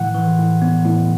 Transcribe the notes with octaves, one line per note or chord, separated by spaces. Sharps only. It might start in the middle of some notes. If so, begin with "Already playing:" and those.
Already playing: A2 E3 F#5
E3
A2
B3
A2